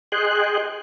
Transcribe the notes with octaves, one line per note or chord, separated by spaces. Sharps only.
G#4 D#5 G5 G#5 C6 F#6